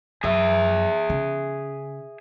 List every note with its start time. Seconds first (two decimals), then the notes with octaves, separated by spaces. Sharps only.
0.24 F#2 G#4 E5
1.09 C#3